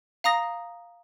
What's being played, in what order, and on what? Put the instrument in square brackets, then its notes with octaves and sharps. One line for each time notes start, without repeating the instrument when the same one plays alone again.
[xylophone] F5 A#5 D#6 A#6